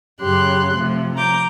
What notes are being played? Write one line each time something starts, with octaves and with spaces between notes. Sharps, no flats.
F#2 C#3 G4 C6 F#6
C3 F3 A3
A#5 D6 G6